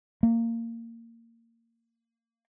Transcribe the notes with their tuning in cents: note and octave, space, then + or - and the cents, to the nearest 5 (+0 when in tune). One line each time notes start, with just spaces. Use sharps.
A#3 -20